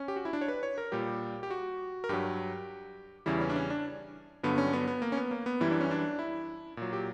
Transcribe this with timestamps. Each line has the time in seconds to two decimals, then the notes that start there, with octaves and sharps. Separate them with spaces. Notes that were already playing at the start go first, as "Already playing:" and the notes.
Already playing: C#4
0.08 G4
0.16 F#4
0.25 E4
0.33 D4
0.41 C#5
0.48 B4
0.63 C#5
0.78 A#4
0.92 A#2 G3 G4
1.43 G4
1.51 F#4
2.04 A#4
2.09 G2 F#3 G4
3.26 E2 C#3 E3 G3 E4
3.41 C#4
3.49 D4
3.56 C#4
3.70 D4
4.43 G2 D3 F#3 B3
4.58 C#4
4.73 B3
4.88 B3
5.02 A#3
5.12 C#4
5.17 B3
5.31 A#3
5.46 B3
5.60 F#2 E3 G3 E4
5.71 D4
5.81 C#4
5.91 D4
6.19 E4
6.77 A#2 F#3
6.93 G4